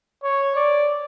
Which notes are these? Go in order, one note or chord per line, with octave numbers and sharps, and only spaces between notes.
C#5
D5